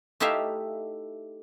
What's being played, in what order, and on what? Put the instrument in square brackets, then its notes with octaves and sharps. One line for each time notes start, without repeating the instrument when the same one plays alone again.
[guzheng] A3 D#4 E4 G4 E5 F5